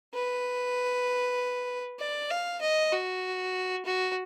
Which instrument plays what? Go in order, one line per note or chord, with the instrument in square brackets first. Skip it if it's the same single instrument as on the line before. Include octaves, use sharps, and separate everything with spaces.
[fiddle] B4
D5
F5
D#5
F#4
F#4